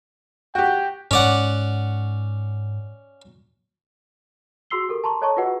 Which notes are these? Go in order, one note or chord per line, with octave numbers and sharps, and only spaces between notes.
F#4 G4 G5
G#2 G#3 C#4 D5 F#5
F#4 G#4 C6 E6 C7 G7
G4 A4 A#4
A5 A#5 C6 C#6
A4 C#5 D#5 A5 A#5 C#6
F4 F#4 G#4 B4 D#5 F#5